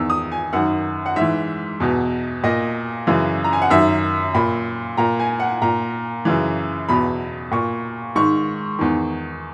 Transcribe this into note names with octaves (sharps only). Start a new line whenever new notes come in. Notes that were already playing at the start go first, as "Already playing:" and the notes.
Already playing: E2 D#3 E6
D#6
G#5
F#2 D#3 F#5
F#5
G#2 E3 E5
E2 B2
A#2 D#5
F#2 C#3 E3
A#5
G#5
F#5
F#2 D#3 E5
A#2 B5
A#2 A#5
G#5
F#5
A#2 A#5
F#2 C#3 E3
E2 B2 B5
A#2 C#6
G#2 D#3 C#6
E2 D#3